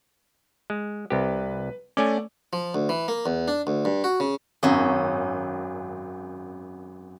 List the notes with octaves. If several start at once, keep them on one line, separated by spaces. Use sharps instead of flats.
G#3
C2 G4 B4
A3 C#4 D5 G#5 D6
F3
D2
E3
A#3
E2
D4
D2
G2
F#4
C#3
G#1 F#2 C#4